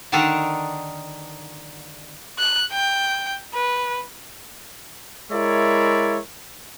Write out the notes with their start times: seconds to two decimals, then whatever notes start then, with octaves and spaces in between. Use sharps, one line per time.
0.12 D3 D#3 D4 D#4 A4 A#4
2.39 F#6
2.72 G5
3.54 B4
5.31 G#3 E4 A#4 C#5 D5 E5